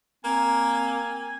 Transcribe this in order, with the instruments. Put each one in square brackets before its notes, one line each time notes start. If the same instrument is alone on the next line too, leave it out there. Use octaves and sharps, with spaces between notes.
[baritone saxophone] A#3 [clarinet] C4 [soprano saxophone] G#5